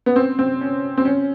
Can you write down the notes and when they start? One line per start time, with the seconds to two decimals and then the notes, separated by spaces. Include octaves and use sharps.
0.06 B3
0.16 C4
0.39 C4
0.61 C#4
0.97 C4
1.05 C#4